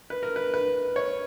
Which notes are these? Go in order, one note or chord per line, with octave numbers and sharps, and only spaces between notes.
B4
A#4
B4
B4
C#5